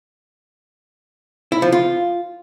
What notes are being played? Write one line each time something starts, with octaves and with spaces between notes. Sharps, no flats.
E4
F3
F4